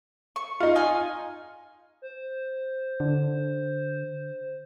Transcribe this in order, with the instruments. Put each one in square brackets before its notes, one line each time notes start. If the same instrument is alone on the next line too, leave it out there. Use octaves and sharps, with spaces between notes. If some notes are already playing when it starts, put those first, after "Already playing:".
[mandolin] C#6
[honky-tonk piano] D#4 F4
[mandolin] D#5 G#5
[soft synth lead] C5
[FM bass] D3